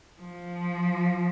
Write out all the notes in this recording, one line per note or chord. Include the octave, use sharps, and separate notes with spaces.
F3